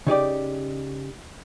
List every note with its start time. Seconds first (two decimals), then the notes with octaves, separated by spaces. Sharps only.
0.07 C#3 D#4 G4 D5